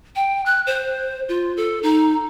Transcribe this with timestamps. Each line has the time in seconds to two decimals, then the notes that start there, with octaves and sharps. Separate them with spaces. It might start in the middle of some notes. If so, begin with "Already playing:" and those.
0.16 G5
0.46 F#6
0.67 C5
1.29 F4
1.57 A4
1.83 D#4